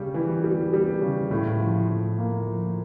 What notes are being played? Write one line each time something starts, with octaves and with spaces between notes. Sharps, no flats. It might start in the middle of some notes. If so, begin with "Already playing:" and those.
Already playing: C#3 G3
E3
G3
G3
C#3
A2
F3
A2
A#3
F3